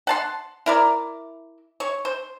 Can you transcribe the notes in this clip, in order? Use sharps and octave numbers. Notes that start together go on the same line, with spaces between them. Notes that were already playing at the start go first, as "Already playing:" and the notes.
F#5 A5 C6
E4 A#4 D5
C#5
C5